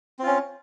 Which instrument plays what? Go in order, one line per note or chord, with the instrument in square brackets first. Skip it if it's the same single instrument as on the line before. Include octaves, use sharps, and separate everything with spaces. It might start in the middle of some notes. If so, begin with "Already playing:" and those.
[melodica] C4
F4
C#4